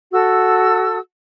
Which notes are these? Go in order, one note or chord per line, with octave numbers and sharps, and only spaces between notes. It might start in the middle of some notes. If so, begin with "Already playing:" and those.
F#4 A4 E6